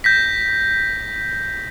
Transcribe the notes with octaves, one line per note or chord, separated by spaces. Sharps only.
G6 A#6 B6